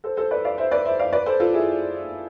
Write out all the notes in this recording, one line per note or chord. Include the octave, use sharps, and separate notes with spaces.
A4 C5
A4 C5
B4 D5
D5 F5
C5 E5
B4 D5
C5 E5
D5 F5
B4 D5
A4 C5
F4 A4
E4 G#4